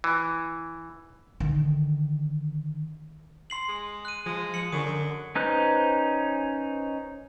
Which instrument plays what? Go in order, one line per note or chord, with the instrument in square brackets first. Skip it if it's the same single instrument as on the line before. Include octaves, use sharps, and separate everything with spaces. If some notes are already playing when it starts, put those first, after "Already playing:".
[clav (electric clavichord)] E3
[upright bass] D3 D#3
[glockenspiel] C6 C7 F#7
[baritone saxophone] G#3
[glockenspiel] F#6 D#7
[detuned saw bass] F3 [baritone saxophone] G#3
[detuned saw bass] F3 [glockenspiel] C#7 F#7
[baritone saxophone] F#2 [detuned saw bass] D3 [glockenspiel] D#6
[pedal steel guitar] C#4 D#4 B4 C5 F#6